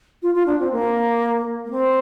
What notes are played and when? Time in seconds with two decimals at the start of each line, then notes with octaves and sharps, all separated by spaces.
0.22 F4
0.35 F4
0.46 D4
0.60 C4
0.72 A#3
1.65 A#3
1.71 C4